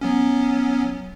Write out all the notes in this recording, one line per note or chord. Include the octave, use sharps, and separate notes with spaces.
F#3 B3 C#4